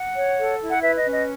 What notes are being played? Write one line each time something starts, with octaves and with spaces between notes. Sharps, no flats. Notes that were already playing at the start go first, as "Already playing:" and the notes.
Already playing: F#5
C#5
A4
E4
F#5
B4 E5
D#5
C#4
D#5